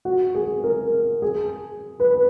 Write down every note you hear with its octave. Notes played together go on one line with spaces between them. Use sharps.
F#4
G#4
A#4
G#4
B4